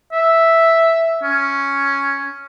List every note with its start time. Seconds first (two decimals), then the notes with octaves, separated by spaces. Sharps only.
0.12 E5
1.23 C#4